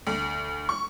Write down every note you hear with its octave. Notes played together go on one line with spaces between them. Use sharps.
D2
C#6